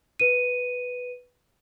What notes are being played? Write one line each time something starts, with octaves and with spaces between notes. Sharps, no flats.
B4 D#7